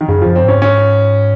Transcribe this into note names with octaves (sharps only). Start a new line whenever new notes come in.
D#3
F#2 C#3
F#2 F3
C4
G#2
C#4
C#4